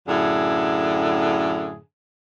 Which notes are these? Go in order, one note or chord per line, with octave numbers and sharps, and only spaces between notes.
F#2 A2 D3 G#4